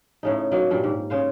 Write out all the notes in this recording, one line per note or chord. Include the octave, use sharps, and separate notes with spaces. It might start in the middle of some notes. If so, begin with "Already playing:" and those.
A2 C#3 D#4
D#3 F#3 A#3 D#4
G2 A#2 G4
G#2
C#3 C5 F5